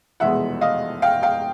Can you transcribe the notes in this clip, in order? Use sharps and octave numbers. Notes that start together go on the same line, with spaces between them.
F1 E2 B2 G#3 B3 E5 F#5
D#5 F5
F5 G5
F5 G5